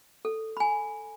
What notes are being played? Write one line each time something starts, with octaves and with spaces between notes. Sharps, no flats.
A4
G#5 B5